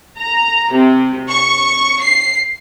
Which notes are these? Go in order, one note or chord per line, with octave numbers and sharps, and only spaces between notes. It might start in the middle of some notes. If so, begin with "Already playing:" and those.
A#5
C3
C#6
C7